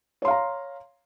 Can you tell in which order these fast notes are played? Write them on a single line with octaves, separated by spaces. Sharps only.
C#5 C6 F5 A#5